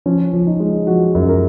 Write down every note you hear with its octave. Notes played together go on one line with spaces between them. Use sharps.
F3 C#4
F3
D#4
G#3
F3 F#4
F#2
A#4